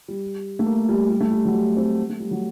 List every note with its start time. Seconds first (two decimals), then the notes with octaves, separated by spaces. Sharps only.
0.08 G3
0.59 A3
0.66 A#3
0.89 G3
1.10 G3
1.21 A3
1.31 G3
1.45 F#3
1.54 G3
1.77 C4
2.10 A3
2.20 G3
2.31 F#3